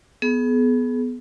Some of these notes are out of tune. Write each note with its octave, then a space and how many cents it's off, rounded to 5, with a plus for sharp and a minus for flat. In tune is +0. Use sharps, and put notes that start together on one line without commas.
B3 +0 G#4 +35